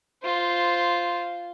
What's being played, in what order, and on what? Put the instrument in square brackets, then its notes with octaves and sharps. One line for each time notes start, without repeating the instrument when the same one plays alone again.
[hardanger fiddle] F4 C5